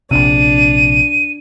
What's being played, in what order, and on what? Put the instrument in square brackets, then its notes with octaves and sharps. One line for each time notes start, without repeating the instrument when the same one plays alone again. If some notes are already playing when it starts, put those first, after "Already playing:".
[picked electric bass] A#1 C3 [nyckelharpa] D4 [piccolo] D#7